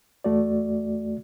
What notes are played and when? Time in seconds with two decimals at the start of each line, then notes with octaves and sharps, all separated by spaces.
0.24 E2 A3 F#4 D5